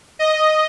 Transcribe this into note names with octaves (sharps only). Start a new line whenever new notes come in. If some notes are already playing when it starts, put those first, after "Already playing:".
D#5